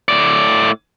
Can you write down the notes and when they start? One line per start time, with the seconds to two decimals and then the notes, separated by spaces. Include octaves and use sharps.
0.08 A2 D5